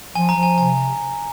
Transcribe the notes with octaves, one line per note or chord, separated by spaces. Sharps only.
F3 G#5
A#5
F3
G#5
C3 G#5